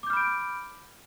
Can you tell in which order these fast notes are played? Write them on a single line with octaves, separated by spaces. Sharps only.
D6 G6 F6 B5 D7